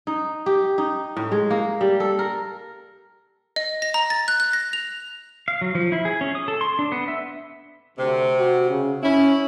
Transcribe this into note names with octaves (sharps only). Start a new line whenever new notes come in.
D#4
G4
D#4
A2
G#3
A#3
G3
A4
A#4
D#5
A#6
A#5
A6
F#6
F#6
A#6
F7
F5
F#3
F3
E4
G#4
C#4
D#6
A4
C6
D4
B3
E5
D2 C3
F#4
C#3
C#4 E4